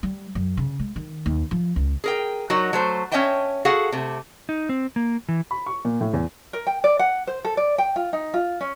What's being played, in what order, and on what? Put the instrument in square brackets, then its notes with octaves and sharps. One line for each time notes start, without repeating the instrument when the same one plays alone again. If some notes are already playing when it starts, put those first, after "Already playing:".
[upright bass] G3
F#2
C#3
G#3
D#3
D#2
F3
C#2
[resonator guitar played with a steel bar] G#4 A#4 G5
F#3 D#4 F#4 A#4 C#5
F#3 A3 C5
C#4 C#5 D#5 E5 G5 A5
F#4 G#4 A4 F5 F#5
C3 A3
[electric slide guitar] D#4
C4
A#3
E3
[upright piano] B5
C#6
A#2
A2
E2
[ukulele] A#4
G5
D5
F#5
C5
A4
D5
G5
F4
D#4
F4
C#4